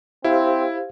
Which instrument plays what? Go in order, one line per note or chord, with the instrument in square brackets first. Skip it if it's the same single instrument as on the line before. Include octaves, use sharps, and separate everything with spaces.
[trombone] C4 [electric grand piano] E4 [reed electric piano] G4 C5 F5